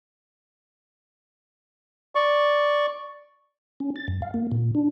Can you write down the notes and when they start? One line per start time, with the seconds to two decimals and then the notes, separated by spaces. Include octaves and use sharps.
2.15 D5 C#6
3.80 C#4
3.96 A6
4.08 F#2
4.22 F5
4.34 A#3
4.51 A#2
4.75 D4